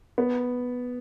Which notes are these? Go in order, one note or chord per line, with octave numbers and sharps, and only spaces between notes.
B3